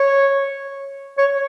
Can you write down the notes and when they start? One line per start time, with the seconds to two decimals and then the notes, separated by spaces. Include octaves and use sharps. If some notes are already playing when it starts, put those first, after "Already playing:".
Already playing: C#5
1.18 C#5